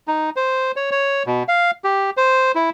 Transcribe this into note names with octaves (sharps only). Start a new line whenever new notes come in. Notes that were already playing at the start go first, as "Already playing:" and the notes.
D#4
C5
C#5
C#5
B2
F5
G4
C5
E4